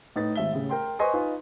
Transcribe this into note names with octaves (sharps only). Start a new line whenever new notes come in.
A2 D#4 B4 A6
G#1 E5 G7
A2 C#3
A#4 G5 C6
B4 C5 D#5 G#5 C6 C#6
D#4 F4 B4